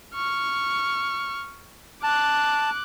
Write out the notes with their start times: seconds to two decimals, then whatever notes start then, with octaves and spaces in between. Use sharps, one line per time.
0.15 C#6 F6
2.03 A5 D6 F#6